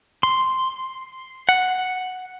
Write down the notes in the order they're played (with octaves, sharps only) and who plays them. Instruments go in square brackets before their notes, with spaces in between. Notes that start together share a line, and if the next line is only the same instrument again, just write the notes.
[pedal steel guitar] C6
[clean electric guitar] F#5